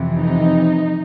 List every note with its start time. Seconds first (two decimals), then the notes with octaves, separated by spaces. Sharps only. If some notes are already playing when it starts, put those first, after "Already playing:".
Already playing: F2 C3 E3
0.16 D#4